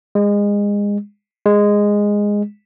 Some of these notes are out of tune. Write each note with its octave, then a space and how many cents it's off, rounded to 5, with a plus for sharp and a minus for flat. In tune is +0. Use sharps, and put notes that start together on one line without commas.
G#3 -25
G#3 -10